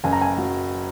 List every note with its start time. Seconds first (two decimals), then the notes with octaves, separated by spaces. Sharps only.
0.04 F#1 G#5
0.13 A#5
0.21 G#5
0.38 F#3